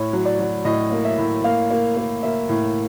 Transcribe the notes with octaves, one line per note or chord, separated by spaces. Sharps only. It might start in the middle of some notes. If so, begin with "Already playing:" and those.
Already playing: A2 C#5
F#3
D5
F#3
A2 D#5
A#3
E5
A2
A#3 F5
A#3
A#3
A#3 E5
A2